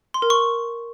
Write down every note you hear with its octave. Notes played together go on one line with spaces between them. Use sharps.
C6
A#4
C#6